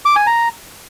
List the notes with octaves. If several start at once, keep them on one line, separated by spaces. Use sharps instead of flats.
D6
G#5
A#5